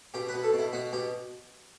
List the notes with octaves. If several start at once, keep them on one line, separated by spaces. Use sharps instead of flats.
B2 G4
B4
B2
A4
B2 E4
B2 F#4
B2 G4